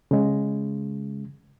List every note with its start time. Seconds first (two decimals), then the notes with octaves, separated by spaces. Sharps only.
0.11 C#3 G#3